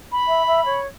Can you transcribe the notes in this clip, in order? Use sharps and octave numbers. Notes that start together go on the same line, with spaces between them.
B5
E5
E5
C#5